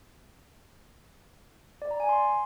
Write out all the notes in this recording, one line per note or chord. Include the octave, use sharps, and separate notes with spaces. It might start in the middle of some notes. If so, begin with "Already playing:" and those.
D5
A#5
G#5
C6